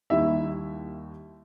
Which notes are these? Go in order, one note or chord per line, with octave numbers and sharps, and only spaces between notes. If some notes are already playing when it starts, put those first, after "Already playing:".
D#2 D#3 G3 E4 E5